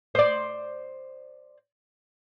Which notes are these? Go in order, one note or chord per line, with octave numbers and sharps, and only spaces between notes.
C5 D5